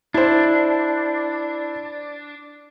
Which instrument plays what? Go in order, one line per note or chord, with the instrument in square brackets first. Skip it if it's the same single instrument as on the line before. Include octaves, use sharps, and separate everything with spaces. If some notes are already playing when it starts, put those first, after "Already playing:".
[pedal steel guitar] D4 [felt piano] E4 C5